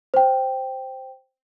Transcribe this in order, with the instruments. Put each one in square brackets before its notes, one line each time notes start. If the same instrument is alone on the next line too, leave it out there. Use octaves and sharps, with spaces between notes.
[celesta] C5 G5